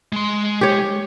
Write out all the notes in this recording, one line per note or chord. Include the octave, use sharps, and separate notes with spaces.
G#3 C6
G4 C#5